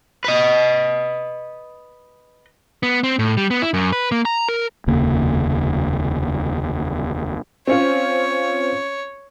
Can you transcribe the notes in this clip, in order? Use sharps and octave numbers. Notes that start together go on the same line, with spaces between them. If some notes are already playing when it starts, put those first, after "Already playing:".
B4 D#5
B3
C4
A2
G3
B3
E4
F#2
B4
A#3
A#5
A#4
F1 D#2 C#3 A#3
C4 C#4 F4 C#5